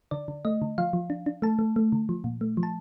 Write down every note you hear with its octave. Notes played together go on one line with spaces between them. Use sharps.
D3 D5
D3
A3 D#5
D3
F3 F5
F3
D4
D4
A3 A5
A3
A3
D3
F3
A#2
A3
F3
A5